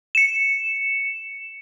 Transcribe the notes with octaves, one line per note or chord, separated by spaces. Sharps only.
C#7 E7